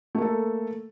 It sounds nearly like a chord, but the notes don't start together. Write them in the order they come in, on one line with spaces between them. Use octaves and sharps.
A3 A#3 A4